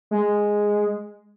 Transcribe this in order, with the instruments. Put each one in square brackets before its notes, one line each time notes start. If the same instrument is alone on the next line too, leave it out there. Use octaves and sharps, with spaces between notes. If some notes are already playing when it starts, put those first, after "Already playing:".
[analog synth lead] G#3